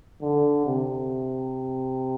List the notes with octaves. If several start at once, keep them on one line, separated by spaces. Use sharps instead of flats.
D3
C3